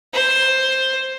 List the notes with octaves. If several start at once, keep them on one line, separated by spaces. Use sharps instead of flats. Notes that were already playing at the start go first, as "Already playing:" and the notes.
C5